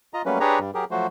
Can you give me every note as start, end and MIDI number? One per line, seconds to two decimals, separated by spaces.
0.14 0.22 65
0.14 0.22 75
0.14 0.22 82
0.26 0.39 54
0.26 0.39 55
0.26 0.39 57
0.26 0.39 58
0.26 0.39 61
0.26 0.39 71
0.40 0.59 62
0.40 0.59 67
0.40 0.59 68
0.40 0.59 71
0.40 0.59 73
0.40 0.59 82
0.59 0.71 43
0.59 0.71 55
0.74 0.85 54
0.74 0.85 67
0.74 0.85 68
0.74 0.85 70
0.91 1.07 53
0.91 1.07 54
0.91 1.07 57
0.91 1.07 66
0.91 1.07 72